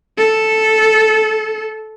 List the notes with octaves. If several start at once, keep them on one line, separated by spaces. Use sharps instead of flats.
A4